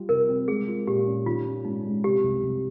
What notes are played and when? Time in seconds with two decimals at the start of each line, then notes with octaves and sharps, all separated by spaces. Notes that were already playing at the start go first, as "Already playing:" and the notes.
Already playing: G3 F4
0.09 C3 A#4
0.29 C4
0.48 G#3 G#4
0.68 F4
0.87 A#2 G4
1.07 C#4
1.26 D#3 F4
1.46 C#4
1.65 G#2 D#4
1.85 G#3
2.04 C3 G4
2.24 C2
2.43 C2